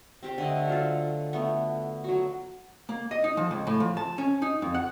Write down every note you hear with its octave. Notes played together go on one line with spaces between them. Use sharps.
C4 G4 C5
D3 A3 D#5
F#3 F4 A4
A3 B3
F#3 F#4
A#3
D#5
D#4
F3
C#2
A2
F3
A5
C#4
D#4
F2
F#5